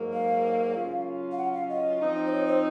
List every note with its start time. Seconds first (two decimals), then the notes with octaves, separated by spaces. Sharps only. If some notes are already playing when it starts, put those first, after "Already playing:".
Already playing: G#2 F#3 A#3
0.13 F5
0.75 C#3 F#3 C#4 F4
1.32 F5
1.38 F#5
1.54 F5
1.69 D#5
2.01 F3 C4 D#4
2.27 C5
2.32 C#5
2.47 C5